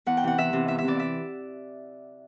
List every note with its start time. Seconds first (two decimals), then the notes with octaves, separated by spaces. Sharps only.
0.06 E2 F#5
0.17 G5
0.23 C3 E3 F#5
0.38 E2 E5
0.53 C3 E3
0.68 E2 E5
0.78 E5
0.84 C3 E3 D5
0.99 E5